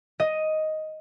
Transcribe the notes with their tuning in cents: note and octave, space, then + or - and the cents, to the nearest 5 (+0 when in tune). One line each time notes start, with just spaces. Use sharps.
D#5 +5